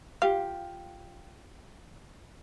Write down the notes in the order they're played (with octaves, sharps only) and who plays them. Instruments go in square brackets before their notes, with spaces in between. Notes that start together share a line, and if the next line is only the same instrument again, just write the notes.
[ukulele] F4 G4 [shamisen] F5